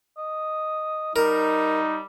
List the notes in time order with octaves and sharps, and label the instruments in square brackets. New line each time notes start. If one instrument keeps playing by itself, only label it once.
[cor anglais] D#5
[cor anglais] G3 [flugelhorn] D#4 [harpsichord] A#4